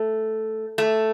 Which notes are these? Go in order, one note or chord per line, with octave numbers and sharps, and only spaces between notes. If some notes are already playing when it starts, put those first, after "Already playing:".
Already playing: A3
A3